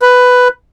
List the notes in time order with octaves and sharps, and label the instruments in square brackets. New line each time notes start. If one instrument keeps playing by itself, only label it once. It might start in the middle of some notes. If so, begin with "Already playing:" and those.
[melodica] B4